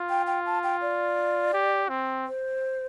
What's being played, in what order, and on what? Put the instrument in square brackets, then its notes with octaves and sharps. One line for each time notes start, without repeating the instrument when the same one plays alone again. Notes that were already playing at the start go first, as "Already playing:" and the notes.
Already playing: [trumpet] F4
[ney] G5
G5
A5
G5
D5
[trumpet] G4
C4
[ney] C5